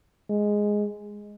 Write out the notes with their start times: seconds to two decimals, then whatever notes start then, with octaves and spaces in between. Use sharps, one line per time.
0.30 G#3